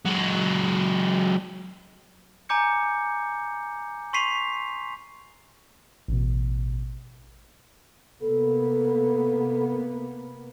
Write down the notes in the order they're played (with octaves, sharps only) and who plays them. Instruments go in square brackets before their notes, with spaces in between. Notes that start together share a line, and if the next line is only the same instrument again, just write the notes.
[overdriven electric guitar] F#3 G#3
[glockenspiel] G#5 A#5 D6 G6 C#7
C6 C#6 B6 C7 D#7 F7
[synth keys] A1 B2
[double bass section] C3 A#3 B3 [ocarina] A4